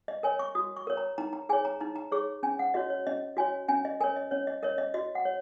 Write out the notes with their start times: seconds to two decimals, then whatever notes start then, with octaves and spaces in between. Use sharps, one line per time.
0.08 D#5
0.23 A#4 C#5 G#5
0.39 C#6
0.55 F#4 D#6
0.76 C#6
0.87 A#4 C#5
0.97 A#5
1.18 D#4 A#5
1.33 A#5
1.49 G#4 C#5 G#5
1.65 A#5
1.81 D#4 A#5
1.96 A#5
2.12 G#4 C#5 C#6
2.43 C#4 G#5
2.59 F#5
2.74 F#4 C#5 D#5
2.90 C#5
3.07 C#4 D#5
3.37 F#4 C#5 G#5
3.68 C#4 G#5
3.85 D#5
4.01 A#4 C#5 G#5
4.16 D#5
4.31 C#4 C#5
4.47 D#5
4.63 A#4 C#5 D#5
4.78 D#5
4.94 F#4 D#5
5.15 F#5
5.25 C#5